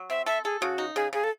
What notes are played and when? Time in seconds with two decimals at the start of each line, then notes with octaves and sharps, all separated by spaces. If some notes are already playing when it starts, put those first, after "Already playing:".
Already playing: F#3
0.10 C4 E5
0.26 A4 E5
0.45 G#4 A4
0.61 C#3 F#4
0.78 D#4
0.96 C#3 G#4
1.13 C#3 G#4
1.24 A4